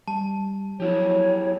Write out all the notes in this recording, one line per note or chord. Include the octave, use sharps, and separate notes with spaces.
G3 A5
F3 F#3 B3 E4 F#4 G4 C#5